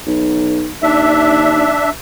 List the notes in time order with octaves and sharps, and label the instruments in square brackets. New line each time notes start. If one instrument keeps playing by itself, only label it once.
[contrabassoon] B1
[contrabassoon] D#2 [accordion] D4 E5